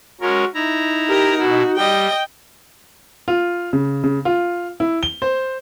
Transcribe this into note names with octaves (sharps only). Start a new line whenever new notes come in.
G#3 C#4 F#4 A#4
D#4 E4 A#5
G4 A#4
B2 E4 F#4
G3 D#5 G5
F4
C#3
C#3
F4
E4
G7
C5